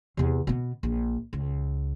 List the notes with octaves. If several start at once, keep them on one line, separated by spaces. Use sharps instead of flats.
E2 C3
B2 B3
A#1
C#2